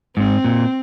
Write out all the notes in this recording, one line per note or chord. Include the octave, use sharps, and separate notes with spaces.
G#2 C4
A#2